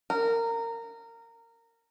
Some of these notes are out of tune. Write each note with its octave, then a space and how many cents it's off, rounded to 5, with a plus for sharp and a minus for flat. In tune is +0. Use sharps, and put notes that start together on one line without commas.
A#4 -20